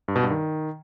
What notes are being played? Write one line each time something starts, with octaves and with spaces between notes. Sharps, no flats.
G2
B2
G2
D#3